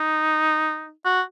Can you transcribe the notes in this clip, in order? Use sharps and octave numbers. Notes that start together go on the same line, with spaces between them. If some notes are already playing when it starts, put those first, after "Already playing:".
Already playing: D#4
F#4